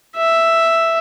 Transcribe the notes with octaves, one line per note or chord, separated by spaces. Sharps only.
E5